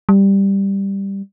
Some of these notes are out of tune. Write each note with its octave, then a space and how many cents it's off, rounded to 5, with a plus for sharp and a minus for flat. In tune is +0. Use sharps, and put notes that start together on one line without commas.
G3 +5